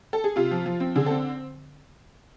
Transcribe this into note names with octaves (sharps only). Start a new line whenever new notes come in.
A4
G#4
C3 F4
F3
F3
C4
D3 G#4
A4
C4